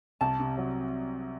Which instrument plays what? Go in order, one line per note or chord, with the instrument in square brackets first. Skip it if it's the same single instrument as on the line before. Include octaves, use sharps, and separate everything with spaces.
[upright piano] C2 [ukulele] A5
[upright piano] C3
F#3